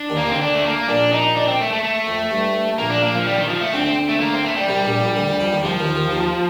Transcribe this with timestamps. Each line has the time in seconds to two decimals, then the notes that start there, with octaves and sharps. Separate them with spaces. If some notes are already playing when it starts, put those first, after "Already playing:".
Already playing: D4
0.09 D#2 D#3
0.16 A#3
0.25 D2 D3 C4
0.41 D4
0.55 A3
0.64 A#3
0.88 A#1 A#2 D4
1.13 D#4
1.36 D4
1.48 C4
1.60 A3
1.72 A3
1.83 A3
2.07 F2
2.31 G2
2.78 A#1 A#2 A#3
2.90 D4
3.02 A#3
3.15 F3
3.27 G3
3.38 D#3
3.50 F3
3.61 A3
3.73 D2 D3 C4
3.86 C4
4.09 A3
4.21 A#3
4.34 C4
4.45 A3
4.56 G3
4.68 C2 C3 G3
4.84 A#1 A#2
5.00 A#1 A#2
5.16 D2 D3
5.28 D2 D3
5.40 F2 F3
5.51 D#2 D#3
5.64 C2 C3 F3
5.79 D#2 D#3
5.95 D#2 D#3
6.11 D#2 D#3